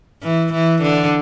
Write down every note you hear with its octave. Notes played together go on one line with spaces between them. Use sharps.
E3
E3
D3